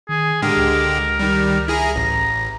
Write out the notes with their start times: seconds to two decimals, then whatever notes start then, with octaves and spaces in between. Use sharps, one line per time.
0.09 D#3 G#4
0.42 A2 D3 G#3 G4 A#4
0.57 C#2
1.19 D#3 G3
1.68 E4 G#4 A#5
1.96 A1 A#5